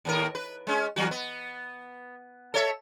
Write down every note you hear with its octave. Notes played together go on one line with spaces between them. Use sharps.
D#2 A2 A#4
B4
G#3 C#4
E2 F#3 F#4
B3
A4 C#5 E5